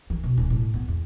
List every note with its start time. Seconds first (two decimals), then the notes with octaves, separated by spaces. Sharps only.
0.10 E3
0.24 B2
0.37 D#1
0.50 A2
0.74 B3
0.88 E2